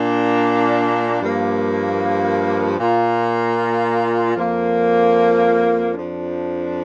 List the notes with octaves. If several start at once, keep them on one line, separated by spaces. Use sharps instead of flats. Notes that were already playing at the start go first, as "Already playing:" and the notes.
Already playing: A#2 A#3 D4
G2 F3 A#3
A#2 A#3 F4 A#4
F2 F3 A#3
F2 F3 D4